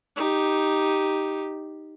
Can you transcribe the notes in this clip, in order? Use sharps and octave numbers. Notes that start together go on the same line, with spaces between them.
D#4 G4